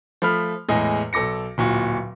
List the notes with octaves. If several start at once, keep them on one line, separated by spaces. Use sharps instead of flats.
F3 A3 B5 F6
E2 A2 G#3 D#5 G#5
B1 A4 D6 A#6 C#7
D1 A#2 F#4